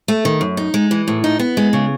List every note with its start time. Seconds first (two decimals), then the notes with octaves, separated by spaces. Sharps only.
0.08 A3
0.25 D#3
0.41 F#2
0.57 D#4
0.74 G#3
0.91 E3
1.08 A2
1.24 D#4
1.39 B3
1.57 G#3
1.73 C#3